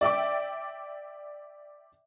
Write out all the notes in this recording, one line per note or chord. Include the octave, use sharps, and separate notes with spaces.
D5 E5 G5 D6